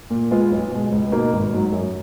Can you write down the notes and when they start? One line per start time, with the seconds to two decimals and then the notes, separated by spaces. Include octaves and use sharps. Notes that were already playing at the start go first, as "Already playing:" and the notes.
0.10 A#2
0.31 G#3 B3 F4
0.51 B1
0.71 B2 G#3
0.92 C#2
1.12 B2 A#3 D#4
1.33 G#1
1.53 G#2 F#3
1.72 F#2